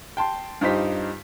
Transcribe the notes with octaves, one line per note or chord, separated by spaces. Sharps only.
G5 A5 C6
G2 D#4 F4 G4 C5 B6